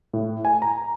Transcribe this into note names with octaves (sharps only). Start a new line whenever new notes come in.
A2
G#5
A#5